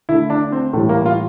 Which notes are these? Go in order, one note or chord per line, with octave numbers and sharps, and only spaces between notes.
D3 A3 E4
D4
C4
A2 E3 G3 A3
A#3
F4